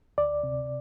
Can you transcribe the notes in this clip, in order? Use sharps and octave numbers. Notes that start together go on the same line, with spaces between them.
D2 D5
C3